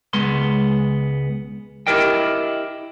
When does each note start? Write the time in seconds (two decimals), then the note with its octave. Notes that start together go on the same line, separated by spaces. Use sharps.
0.13 C#2 G#3 B3 C6
1.87 E4 G4 A#4 D#5 G5